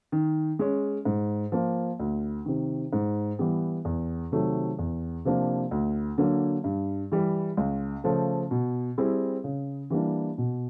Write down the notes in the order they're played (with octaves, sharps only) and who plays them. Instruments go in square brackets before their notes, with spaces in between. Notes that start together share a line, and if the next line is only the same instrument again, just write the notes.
[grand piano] D#3
G#3 C#4
G#2
F3 A#3
D2
C3 D#3
G#2
E3 G3 B3
E2
C3 D#3 F#3 A3
E2
C3 F3 A#3 D4
D2
D3 F#3 A#3
G2
E3 G3
C#2
C#3 F3 A3
B2
G3 C4 E4 G#4
C#3
E3 G3 A#3 D4
B2